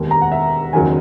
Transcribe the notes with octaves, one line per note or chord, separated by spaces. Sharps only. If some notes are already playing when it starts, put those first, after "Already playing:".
Already playing: E1 D#2 D#3
A#5
F#5
E5
F#1 E2 D#3 F#3 G#5